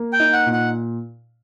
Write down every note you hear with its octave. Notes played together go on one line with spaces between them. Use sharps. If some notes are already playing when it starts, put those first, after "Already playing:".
Already playing: A#3
G5
D#4
F#5
A#2
F#5